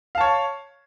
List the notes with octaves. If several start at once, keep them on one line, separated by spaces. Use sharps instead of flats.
C#5 F5 A5